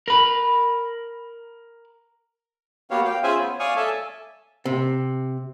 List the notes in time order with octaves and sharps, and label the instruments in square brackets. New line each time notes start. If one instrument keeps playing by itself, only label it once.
[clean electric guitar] A#4 B5
[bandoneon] A#3 B3 F#4 G4 C#5 F5
F5 G5
C#4 F4 G#4 C5 E5 G#5
B3
C#5 D5 F5 G#5 C#6 D#6
A4 E5 G#5 A5
[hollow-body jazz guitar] C3